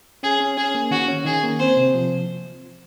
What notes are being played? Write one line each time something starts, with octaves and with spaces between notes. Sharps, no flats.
C#4 G#4
C#4
C#4 G#4
A#3
D#3 F#4
C#4
D#3 G#4
A#3
C4 C5
C3
F3